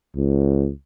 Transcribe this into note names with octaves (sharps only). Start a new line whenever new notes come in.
C#2